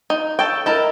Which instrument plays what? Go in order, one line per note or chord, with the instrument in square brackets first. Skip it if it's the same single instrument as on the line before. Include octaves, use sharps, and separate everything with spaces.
[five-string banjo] D#4
A4 C#5 G5
[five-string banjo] E4 A4 [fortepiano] A#4 D#5